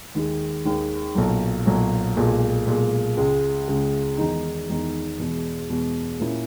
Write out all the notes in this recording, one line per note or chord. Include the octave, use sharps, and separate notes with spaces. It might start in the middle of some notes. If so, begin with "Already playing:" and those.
D#2 D#3 G#3
D#2 D#3 G#3
B1 A#2 F#3
B1 A#2 F#3
B1 A#2 G#3
B1 A#2 G#3
C#2 C#3 G#3
C#2 C#3 G#3
E2 D#3 G#3 D#4
E2 D#3 G#3 D#4
E2 B2 G#3
E2 B2 G#3
A#2 A#3 C#4 E4